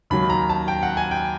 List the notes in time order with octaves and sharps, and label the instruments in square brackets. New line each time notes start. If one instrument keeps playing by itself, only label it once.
[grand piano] D#2 D#3 F#3 B5
A#5
A5
G5
F#5
G#5
G5